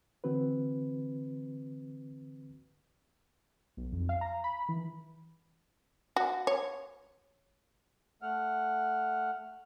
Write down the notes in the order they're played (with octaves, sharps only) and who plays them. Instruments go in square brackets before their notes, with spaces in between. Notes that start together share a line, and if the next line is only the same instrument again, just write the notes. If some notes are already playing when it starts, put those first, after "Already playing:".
[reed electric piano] D3 E3 C4 F#4 B4
[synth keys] B1
F2
F5
A#5
B5
E3
[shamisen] F#4
C#5
[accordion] A3 F#5 F6